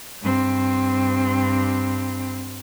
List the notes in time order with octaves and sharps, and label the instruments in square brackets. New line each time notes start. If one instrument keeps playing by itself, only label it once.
[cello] G2 C4